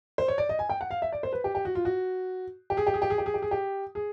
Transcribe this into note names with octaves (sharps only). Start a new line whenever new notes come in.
C5
C#5
D5
D#5
G#5
G5
F#5
F5
E5
D5
C5
B4
G4
G4
F#4
F4
F#4
G4
G#4
G4
G#4
G4
G#4
G4
G#4
G4
G#4
G4
G#4